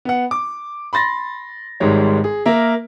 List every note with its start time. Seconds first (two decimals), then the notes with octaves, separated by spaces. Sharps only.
0.05 B3 F#5
0.31 D6
0.93 B5 C6 A6 A#6
1.80 G#1 G#2 G3 G#3 C#5
2.24 G#4
2.46 A#3 A#4 E5